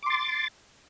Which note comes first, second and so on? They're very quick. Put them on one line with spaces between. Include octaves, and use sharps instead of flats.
D6 C6 A6